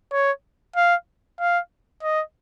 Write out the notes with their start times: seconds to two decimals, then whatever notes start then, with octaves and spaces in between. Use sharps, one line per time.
0.12 C#5
0.76 F5
1.40 F5
2.03 D#5